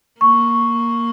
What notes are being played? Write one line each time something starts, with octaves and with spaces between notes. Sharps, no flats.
A#3 C#6